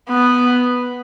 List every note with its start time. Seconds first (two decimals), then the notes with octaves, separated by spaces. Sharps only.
0.10 B3